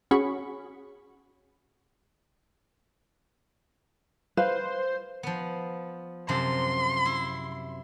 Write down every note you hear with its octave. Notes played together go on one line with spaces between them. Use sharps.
C#4 F#4 G#4 B5 C#6
B4 C5 F5
F3 B3
F#2 C3 F3 C6
E4